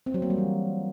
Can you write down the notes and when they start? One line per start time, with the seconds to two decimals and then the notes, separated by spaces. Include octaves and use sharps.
0.06 C4
0.14 F#3
0.22 A#3
0.30 G3
0.38 E3